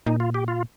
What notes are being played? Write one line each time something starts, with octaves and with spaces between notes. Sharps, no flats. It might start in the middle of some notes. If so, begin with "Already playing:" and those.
A#2 D#4
F4
G4
F4